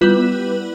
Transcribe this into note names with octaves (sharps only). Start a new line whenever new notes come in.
G3 B3 E4 F4 B4